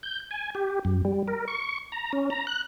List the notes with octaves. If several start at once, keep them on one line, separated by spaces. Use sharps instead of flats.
G6
G#5
G4
F#2
G3
A#4
C#6
A#5
C#4
A#5
F#6